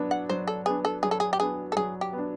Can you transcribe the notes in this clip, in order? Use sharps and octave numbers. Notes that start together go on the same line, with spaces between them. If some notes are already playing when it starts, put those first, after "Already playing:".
Already playing: F#3 B3 D4
F#5
F#3 C5
A4
B3 D4 G#4
A4
F#3 G#4
A4
G#4
G4
B3 D4 G#4
A4
F#3 G#4
G4
B3 D4